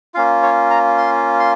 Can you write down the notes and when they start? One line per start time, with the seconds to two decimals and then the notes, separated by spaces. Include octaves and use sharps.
0.14 A#3 C#4 F4 F5
0.43 C#5
0.70 A#5
0.98 C6
1.40 C6